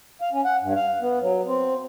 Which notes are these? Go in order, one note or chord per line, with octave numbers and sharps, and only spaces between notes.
F5
C#4
F#5
G2
F5
B3
F#3
C4